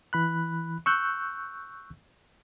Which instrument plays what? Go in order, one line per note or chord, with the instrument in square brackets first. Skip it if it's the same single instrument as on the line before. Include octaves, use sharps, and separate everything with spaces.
[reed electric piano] E3 B5 F#6
C#6 E6 F#6 G6